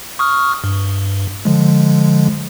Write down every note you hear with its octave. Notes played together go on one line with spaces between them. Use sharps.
C#6 D#6 F6
G2
D3 F3 G#3